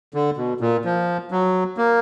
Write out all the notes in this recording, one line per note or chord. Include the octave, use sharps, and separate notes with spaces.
D3
B2
A#2
F3
F#3
A#3